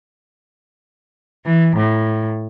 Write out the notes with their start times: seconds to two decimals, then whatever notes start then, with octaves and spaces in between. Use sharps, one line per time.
1.45 E3
1.76 A2